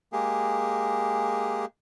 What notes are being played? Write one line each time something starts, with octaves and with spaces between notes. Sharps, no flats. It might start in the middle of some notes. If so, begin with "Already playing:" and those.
G#3 A#3 G4 G#4